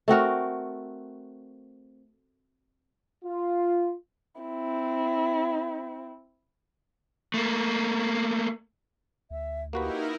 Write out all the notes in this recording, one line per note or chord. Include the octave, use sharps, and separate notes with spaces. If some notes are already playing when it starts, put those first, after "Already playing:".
A3 C4 F#4 A#4
F4
C4 E4
A3 A#3
D2 E5
A#3 D#4 E4 F#4 G4 A#4 B4